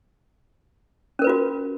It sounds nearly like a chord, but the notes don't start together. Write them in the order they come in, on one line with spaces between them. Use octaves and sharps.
C#4 A#4 B4 F4 F#4